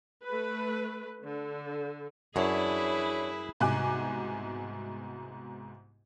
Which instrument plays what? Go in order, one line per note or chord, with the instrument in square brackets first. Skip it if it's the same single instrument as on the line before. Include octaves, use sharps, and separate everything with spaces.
[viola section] A3 B4
D3
[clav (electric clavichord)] F#2 [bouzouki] D4 C#5 [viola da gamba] E4 [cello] G#4 B4
[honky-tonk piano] C2 G#2 B2 G#5 D6 F#6